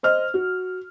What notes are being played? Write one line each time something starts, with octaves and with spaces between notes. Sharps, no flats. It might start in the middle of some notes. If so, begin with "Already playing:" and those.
C5 D#5 F6
F#4